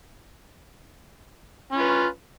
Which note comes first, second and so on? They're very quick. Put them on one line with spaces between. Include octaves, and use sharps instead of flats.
C#4 F4 B4